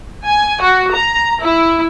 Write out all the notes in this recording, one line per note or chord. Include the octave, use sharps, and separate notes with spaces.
G#5
F#4
A#5
E4